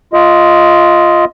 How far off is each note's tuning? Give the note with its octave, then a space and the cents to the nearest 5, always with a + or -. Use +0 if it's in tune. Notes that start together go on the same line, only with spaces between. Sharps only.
F4 -5 D#5 +15